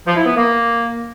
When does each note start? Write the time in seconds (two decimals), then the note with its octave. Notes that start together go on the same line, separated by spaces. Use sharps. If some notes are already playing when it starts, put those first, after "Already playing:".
0.07 F3
0.16 E4
0.26 B3
0.36 A#3